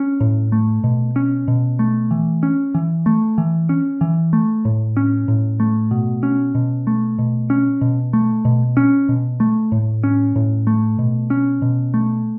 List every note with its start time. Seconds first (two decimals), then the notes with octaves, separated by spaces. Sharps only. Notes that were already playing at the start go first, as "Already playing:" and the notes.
Already playing: C#4
0.20 A2
0.52 A3
0.84 B2
1.16 C#4
1.48 B2
1.79 A3
2.11 E3
2.43 C#4
2.75 E3
3.06 A3
3.38 E3
3.69 C#4
4.01 E3
4.33 A3
4.65 A2
4.97 C#4
5.28 A2
5.60 A3
5.91 B2
6.23 C#4
6.55 B2
6.87 A3
7.19 B2
7.50 C#4
7.81 B2
8.13 A3
8.45 B2
8.77 C#4
9.09 B2
9.40 A3
9.72 A2
10.04 C#4
10.36 A2
10.67 A3
10.99 B2
11.30 C#4
11.62 B2
11.94 A3